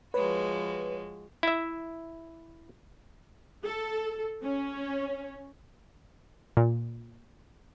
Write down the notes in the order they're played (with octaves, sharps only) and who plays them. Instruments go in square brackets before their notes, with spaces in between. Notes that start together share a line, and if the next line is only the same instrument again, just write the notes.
[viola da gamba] F3 G#3 F#4 [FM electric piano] B4 [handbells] C#5
[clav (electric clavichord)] E4 E5
[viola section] A4
C#4
[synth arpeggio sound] A#2